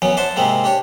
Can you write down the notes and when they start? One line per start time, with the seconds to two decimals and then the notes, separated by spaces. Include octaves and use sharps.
0.02 F#2 E3 F#3 B3 C#4
0.17 C5 D5 E5 F#5 A5 C6
0.36 G#2 C3 G#3 A#3 C4 E4
0.64 D4 G4 C#5